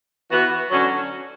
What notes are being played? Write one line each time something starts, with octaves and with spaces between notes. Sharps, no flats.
E3 B3 F#4
D3 F#3 C#4 F#4